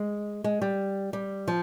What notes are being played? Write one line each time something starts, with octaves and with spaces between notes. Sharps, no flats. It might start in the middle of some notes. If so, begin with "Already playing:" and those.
Already playing: G#3
G#3
G3
G3
F3